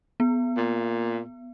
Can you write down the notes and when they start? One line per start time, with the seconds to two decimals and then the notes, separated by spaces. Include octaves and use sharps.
0.20 B3
0.57 A#2